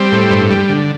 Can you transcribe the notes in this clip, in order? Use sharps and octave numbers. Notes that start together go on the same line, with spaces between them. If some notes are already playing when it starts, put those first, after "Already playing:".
Already playing: G3 C4
A2
G2
G3
D3